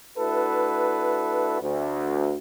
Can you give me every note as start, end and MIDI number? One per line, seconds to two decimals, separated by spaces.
0.18 1.58 57
0.18 1.58 62
0.18 1.58 64
0.18 1.58 66
0.18 1.58 69
0.18 1.58 71
1.61 2.36 38